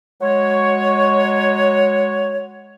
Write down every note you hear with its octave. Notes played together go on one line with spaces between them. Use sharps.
F#3 G#3 C#5